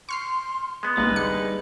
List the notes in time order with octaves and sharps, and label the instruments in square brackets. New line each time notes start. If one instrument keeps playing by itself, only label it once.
[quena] C6 [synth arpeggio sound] C#6 F6 C7
[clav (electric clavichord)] G#3 B3
[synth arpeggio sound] G#1 C#2 A#3 [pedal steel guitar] G3 D#4 B4 [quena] G#4
[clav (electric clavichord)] D3 [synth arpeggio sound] C#7